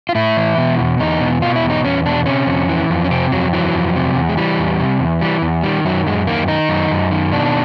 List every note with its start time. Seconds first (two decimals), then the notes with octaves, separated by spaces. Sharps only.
0.09 F4
0.15 A2 E4
0.37 E3
0.58 B2
0.79 E2
0.99 E2 D#4
1.21 B2
1.42 B2 F4
1.55 E4
1.63 E2
1.70 D#4
1.84 E2 C#4
2.05 B2 D4
2.26 C3 C#4
2.47 F2
2.69 E3
2.90 F2
3.04 C#4
3.11 C3 C4
3.32 F2 F#3
3.53 E3 F#3
3.75 F2
3.96 C3
4.16 E2
4.29 G#3
4.37 E3 G3
4.59 E2
4.80 C3
5.00 E2
5.21 E3 G3
5.42 E2
5.63 D#3 G3
5.85 F#2 F#3
6.06 F#2 G#3
6.27 D#3 A#3
6.48 D#3 D#4
6.69 F#2
6.91 F#2
7.11 D#3
7.32 B2 D4